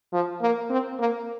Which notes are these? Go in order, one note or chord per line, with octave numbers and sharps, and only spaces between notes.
F3
A#3
C4
A#3